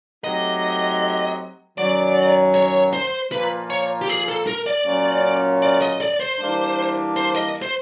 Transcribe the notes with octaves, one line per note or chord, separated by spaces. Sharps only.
F#3 A3 C4 D#4 G4 D#5
F#2 D#3 F#3 D5
C#5
C5
A#2 F3 A#3 B4
C#5
G4
G#4
A4
A#4
D5
A#2 F#3 A#3 C#4
D5
D#5
D5
C5
E3 G3 A#3 D4
C5
D#5
C5